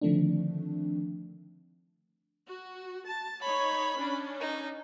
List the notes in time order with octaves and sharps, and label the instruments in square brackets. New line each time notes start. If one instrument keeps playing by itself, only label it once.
[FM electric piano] D3 D#3 F3 A3 C4 D4
[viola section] F#4
A5
[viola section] D#4 C#5 [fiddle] B5
[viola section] C#4 D4
[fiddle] D#4